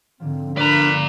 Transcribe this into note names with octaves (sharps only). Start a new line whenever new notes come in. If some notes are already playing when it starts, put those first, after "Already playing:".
G#2 D3 F3 C4
F3 A3 D4 A#4 B4 D5 A#5 B5